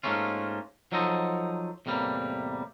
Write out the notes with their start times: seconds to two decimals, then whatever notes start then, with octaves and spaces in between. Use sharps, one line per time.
0.03 G#2 A3 A#3 C#4 F4
0.92 F3 F#3 D#4 A4 C5 D#5
1.86 E2 A2 C3 G3 A#3